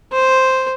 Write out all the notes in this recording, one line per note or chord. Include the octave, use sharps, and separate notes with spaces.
C5